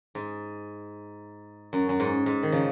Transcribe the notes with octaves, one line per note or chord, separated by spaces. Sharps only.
G#2
F#2
F#2
G#2
G#2
D#3
C#3 F3